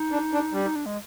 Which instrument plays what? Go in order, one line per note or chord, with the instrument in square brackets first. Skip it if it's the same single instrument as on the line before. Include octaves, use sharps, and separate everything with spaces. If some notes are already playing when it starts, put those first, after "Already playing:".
Already playing: [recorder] D#4
[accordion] D4
D4
[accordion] G3 [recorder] D4
[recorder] D#4
D4
G#3